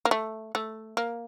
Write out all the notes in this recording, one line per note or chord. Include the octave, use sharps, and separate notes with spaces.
A#3
A3
A3
A#3